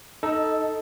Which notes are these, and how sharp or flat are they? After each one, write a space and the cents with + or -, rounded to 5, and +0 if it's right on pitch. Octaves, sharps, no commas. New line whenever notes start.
D#4 +0 A4 +0 D#5 +20